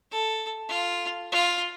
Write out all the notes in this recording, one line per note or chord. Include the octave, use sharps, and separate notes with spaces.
A4
F4
F4